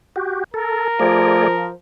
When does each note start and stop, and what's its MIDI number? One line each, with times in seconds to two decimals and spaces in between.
0.16 0.44 66
0.16 0.44 67
0.54 0.88 69
0.54 1.71 70
0.99 1.67 53
0.99 1.48 57
0.99 1.48 68
0.99 1.48 74